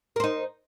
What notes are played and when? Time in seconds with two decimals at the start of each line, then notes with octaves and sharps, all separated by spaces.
0.16 A#4
0.20 C5
0.24 D#4